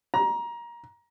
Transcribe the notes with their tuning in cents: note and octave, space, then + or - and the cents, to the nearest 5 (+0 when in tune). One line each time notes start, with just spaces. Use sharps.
A#5 +20